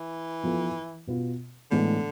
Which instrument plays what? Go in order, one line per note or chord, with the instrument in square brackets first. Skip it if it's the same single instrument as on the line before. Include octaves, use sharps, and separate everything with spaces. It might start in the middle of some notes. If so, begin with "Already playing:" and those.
Already playing: [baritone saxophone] E3
[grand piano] F3 B3 F4 A4
B2 B3 F4
[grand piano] A2 E3 G#3 B3 [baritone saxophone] D3